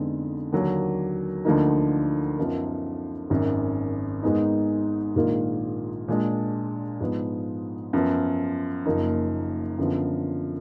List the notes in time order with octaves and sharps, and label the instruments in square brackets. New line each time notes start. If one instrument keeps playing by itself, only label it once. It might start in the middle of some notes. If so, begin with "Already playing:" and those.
Already playing: [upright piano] F2 D3 G#3 B3 D#4
D#2 D3 F#3 A#3
D2 D3 F3 A#3 D#4
F#2 F3 B3 D#4 A#4
G#1 F#2 D#3
G#2 D#3 G#3 B3 D#4
A#1 G#2 D#3 A#3 F4
A#2 G#3 D4
G#2 F3 B3
F#2 F3 B3
F#1 F#2 F3 A#3 D#4
F#2 D3 F3 B3 F4